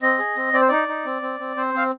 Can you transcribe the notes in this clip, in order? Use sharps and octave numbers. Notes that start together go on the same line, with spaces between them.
C4 D#5
G#4
C4
C4 D5
C5
D#4 D5
D#4
C4
C4
C4
C4 C5
C4 F5